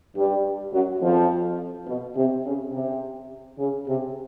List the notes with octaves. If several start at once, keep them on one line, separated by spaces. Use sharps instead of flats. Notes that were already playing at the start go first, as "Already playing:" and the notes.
G2 G3
F#2 F#3
F2 F3
B2
C3
C#3
C3
C#3
C3